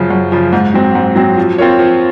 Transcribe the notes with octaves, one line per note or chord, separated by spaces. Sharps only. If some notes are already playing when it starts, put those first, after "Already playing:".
Already playing: F#2 C#3 F3
F#2
C#3 F3
G#2
F#3 C4
G#2
F#3 C4
F3
C4 F4 A#4 C#5
F3